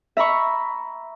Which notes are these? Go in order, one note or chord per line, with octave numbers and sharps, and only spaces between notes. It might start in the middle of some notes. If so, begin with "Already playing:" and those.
E5 A#5 B5 C#6